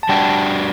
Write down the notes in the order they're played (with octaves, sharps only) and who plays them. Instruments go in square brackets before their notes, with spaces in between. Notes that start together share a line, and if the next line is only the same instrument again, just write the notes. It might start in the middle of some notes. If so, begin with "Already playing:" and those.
[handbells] A5
[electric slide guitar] G3 D4 F#4 [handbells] G5